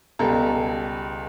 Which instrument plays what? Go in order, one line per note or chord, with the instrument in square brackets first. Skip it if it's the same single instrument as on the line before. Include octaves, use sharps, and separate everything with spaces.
[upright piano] C#2 B2 G3 A4 A#5